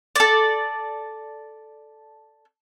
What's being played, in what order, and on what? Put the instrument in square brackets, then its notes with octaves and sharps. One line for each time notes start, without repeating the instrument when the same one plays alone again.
[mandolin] A4 D5